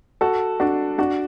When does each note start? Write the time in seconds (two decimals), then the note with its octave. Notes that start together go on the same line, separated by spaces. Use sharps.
0.21 F#4 A4
0.60 D4 F#4
0.98 D4 F#4